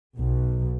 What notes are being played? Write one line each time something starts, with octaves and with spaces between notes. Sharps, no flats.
B1